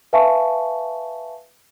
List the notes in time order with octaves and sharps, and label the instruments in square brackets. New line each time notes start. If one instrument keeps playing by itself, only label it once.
[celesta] B4 E5 F5 G#5 A5 C#6